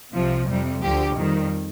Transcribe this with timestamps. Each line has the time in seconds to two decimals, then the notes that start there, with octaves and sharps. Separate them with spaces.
0.14 C2 C3 F3
0.48 F2 C3 G3
0.82 D2 D3 F3 G4
1.17 F2 D#3 G3